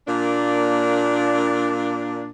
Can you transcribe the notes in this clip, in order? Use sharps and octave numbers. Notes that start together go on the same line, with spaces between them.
A#2 A#3 D4